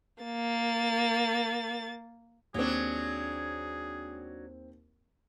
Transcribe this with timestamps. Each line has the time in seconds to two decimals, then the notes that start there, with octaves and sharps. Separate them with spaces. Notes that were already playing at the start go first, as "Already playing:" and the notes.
0.24 A#3 A6
2.54 D#2 F#3 C4 D4 G#4